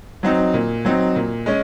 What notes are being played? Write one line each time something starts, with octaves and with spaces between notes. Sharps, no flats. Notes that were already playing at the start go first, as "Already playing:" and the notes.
F#3 C4 D#4
A#2
F#3 C4 D#4
A#2
G#3 C#4